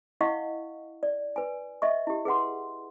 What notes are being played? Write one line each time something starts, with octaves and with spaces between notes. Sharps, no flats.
E4 D#5 F5 F#5 C#6
D5
B4 G#5
D#5 E5 C#6
E4 G4
G#4 B4 F#5 C6